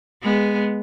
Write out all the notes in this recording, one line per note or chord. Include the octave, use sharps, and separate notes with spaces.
G#3 B3